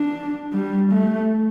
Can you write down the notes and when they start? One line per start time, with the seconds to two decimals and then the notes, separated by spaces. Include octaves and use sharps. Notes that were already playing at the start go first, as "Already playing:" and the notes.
Already playing: D4
0.53 G3
0.92 A3